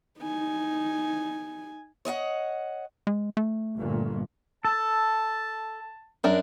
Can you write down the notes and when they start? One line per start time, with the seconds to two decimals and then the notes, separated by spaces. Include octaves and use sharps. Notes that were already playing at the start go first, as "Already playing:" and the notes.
0.19 D#4 G#5
2.05 C#5 D#5 F5 F#5
3.07 G#3
3.37 A3
3.78 G1 A#2
4.65 A4 A5
6.24 F#2 D4 A#4